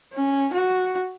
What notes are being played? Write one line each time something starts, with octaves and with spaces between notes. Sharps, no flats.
C#4
F#4